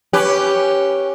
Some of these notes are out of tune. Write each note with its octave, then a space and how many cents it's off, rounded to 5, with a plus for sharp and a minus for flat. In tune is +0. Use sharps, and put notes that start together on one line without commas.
C#4 +0 G4 +0 B4 +0